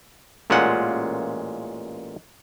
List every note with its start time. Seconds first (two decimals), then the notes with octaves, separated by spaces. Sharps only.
0.50 A1 A#2 G#3 C#4 F4 F#5